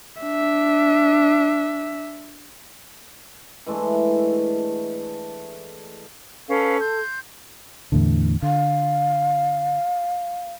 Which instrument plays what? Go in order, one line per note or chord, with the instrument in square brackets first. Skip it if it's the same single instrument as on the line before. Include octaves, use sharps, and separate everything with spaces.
[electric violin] D4 E5
[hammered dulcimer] E3 G#3 A3 D4
[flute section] C#4 B4 F5 [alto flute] A4
[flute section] C6 G6
[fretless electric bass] E2 A2 D3
[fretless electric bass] D3 [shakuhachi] F5